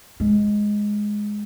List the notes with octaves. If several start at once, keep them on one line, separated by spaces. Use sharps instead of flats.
G#3